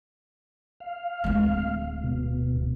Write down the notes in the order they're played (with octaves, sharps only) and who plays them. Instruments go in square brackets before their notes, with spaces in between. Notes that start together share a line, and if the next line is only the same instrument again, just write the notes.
[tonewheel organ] F5
[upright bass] D1 G#3
[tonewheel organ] B2